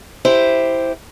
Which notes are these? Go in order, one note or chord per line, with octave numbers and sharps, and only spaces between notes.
E4 G4 C5